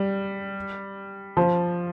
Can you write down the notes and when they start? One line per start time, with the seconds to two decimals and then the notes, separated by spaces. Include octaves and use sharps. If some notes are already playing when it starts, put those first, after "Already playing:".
Already playing: G3
1.37 F3